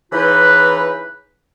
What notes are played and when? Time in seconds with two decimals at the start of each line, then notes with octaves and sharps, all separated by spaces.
0.12 C#3 E3 D#4 F4 B4